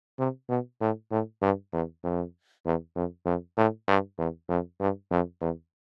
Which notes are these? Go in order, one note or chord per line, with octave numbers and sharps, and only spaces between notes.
C3
B2
A2
A2
G2
E2
F2
E2
F2
F2
A2
G2
E2
F2
G2
F2
E2